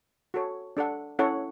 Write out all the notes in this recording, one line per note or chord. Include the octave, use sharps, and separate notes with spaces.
F#4 A4 C#5
D4 A4 D5 F#5
C#4 E4 A4 C#5 F#5